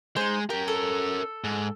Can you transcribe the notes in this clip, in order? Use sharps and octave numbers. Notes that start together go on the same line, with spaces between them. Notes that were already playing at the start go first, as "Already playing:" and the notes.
G#3 D#4 C5
C#4 G4 A#4
A4
G#2